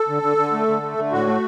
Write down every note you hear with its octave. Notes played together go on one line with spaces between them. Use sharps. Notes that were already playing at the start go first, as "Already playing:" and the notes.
Already playing: A4
D3
D3
D3
A3
D3
A3
D3
A2 F#4
A3